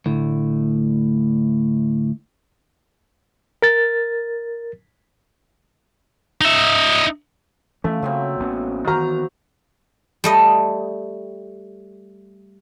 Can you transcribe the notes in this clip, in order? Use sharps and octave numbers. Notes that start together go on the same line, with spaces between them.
D2 A2
A#4 A6
D#4 E5
E3 A3 C#4 E4 F4
C#3 F#3 A#3 C4
A1 B3 C#4
D#3 E3 B3 C4 F#4 A#5 F6
G3 A3 D#5